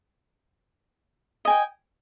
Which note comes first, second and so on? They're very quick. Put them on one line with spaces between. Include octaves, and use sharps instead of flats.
D#5 G#5 G5